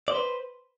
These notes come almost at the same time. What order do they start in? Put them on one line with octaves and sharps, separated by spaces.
D5 C5 B4